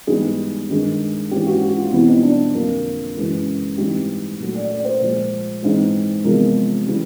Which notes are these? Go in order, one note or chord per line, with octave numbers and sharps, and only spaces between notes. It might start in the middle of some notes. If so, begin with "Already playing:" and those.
G#2 E3 G3 B3 G#4
G2 D#3 G#3
G#2 E3 G#3 C#4 G4
F#4
F#4
F4
E2 B2 G3 C4 E4
D#4
D4
F2 D3 F#3 A#3
F#2 C#3 E3 G#3
G#2 E3 G3 C4 G4
A#2 F#3 A3
D5
D5
C5
A#2 F3 G#3
G#2 E3 G#3 C4
E2 C3 F3 G#3 A#4
C#3 E3 G3